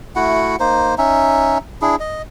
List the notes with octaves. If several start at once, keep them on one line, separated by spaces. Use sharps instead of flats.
A3 E4 F#4 F#5
A#3 D#4 C5
C#4 D#4 E5
D4 E4 G#4
D#5